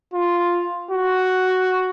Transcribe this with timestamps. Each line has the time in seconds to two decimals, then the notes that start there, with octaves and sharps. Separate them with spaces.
0.14 F4
0.91 F#4